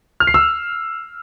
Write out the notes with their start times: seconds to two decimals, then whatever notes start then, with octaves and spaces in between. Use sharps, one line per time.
0.20 F6
0.27 C7
0.34 E6